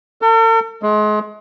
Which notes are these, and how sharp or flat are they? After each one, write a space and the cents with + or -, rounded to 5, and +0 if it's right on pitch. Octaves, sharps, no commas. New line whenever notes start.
A4 +45
G#3 +30